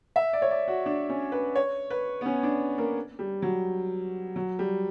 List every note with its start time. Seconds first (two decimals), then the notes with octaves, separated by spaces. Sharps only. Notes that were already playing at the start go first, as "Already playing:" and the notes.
0.16 E5
0.33 D5
0.42 C#5
0.51 D5
0.68 F#4
0.86 D4
1.10 C#4
1.32 B4
1.56 C#5
1.90 B4
2.21 B3
2.26 C#4
2.43 D4
2.78 A#3
3.19 G3
3.42 F#3
4.36 F#3
4.59 G3